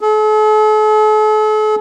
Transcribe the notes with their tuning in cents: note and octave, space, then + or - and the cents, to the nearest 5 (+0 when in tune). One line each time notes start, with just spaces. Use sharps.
A4 -45